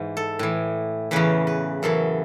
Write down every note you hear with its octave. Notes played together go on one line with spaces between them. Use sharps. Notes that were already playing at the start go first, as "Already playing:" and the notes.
Already playing: G#2 E3
A4
A2 E3
E2 C#3 E3 B4
B4
F#2 E3 A4